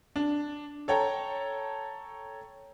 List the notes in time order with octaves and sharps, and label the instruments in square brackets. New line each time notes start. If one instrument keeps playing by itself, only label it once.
[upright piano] D4
A4 C#5 G5 A#5